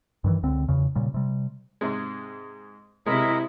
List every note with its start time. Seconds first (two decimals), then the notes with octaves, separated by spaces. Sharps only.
0.24 G2 D#3 E3
0.43 C#2 D3 C4
0.69 E2 C#3
0.95 A#2 C#3 G3
1.14 C3 G3
1.81 G#2 C3 G#3
3.06 C3 G#3 E4 A#4 D#5